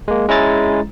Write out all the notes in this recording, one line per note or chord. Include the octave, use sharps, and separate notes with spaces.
G#3 A#3
G#3 C#4 E4 A#5 A6